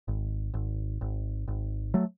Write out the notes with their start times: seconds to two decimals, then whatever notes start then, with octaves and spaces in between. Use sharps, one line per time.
0.08 G#1
0.54 G#1
1.01 G#1
1.48 G#1
1.94 F#3 A3